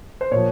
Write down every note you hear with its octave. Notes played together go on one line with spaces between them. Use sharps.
C5
A#2 F3 C#5